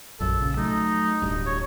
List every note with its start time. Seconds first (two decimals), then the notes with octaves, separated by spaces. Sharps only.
0.20 A#1 F#2 A4
0.39 A#1 C#3
0.57 F#3 A3 D#4
1.22 D1 G2
1.46 C#5